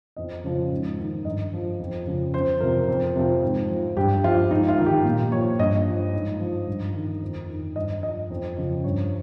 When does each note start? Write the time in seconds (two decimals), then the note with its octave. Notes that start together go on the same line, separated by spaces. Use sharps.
0.16 F2 D#5
0.44 C#3 F3
0.71 G#2
0.98 D#3
1.25 G2 D#5
1.53 F3
1.80 F2
2.07 C#3 F3
2.34 F2 C5
2.60 C3 F3 A#4
2.88 F2
3.16 C3 F3
3.43 G#2
3.70 F3
3.97 G2 G4
4.24 F3 F4
4.50 G#2 D#4
4.68 F4
4.78 D#3
4.86 G4
5.05 A#2
5.32 F3 C#5
5.59 G2 D#5
5.86 F3
6.13 G#2
6.40 F3
6.68 G2
6.94 D#3
7.22 F2
7.49 D#3
7.76 G2 D#5
8.03 F3 D#5
8.30 F2
8.57 C#3 F3
8.84 G2 C#5